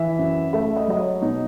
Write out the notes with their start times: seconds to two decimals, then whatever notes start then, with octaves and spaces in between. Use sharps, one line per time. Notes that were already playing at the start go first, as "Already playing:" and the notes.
Already playing: E3 E5
0.19 F#2
0.53 A3 E5
0.76 D#5
0.88 F#3 D#5
0.99 C#5
1.22 B2 D#4